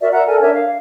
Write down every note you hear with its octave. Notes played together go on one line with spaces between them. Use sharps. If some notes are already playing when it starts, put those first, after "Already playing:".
F#4 A#4 D5 E5
E5 F#5 A#5
A4 A#4 D5 G#5
D4 A#4 C#5 E5
F5